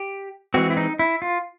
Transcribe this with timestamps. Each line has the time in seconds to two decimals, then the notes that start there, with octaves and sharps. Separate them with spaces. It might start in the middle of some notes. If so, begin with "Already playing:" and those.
Already playing: G4
0.54 E3 G#3 C4 F#4
0.70 E4
0.77 D#4
0.99 E4
1.22 F4